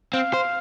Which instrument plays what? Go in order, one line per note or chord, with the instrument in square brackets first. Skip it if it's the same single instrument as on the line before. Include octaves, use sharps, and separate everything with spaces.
[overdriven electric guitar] C4 [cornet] F5
[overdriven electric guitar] C5